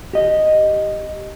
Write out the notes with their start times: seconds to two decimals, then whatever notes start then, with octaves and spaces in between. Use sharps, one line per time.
0.13 G4 D#5